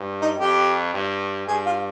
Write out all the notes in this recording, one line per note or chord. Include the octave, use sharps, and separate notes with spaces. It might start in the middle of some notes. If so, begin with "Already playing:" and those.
Already playing: G2
D#4
F2 G4
G2
G2 G#4
F4